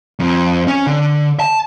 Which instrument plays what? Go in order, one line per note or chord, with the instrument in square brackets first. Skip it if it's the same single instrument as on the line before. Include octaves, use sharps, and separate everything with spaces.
[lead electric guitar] F2
C#4
D3
A5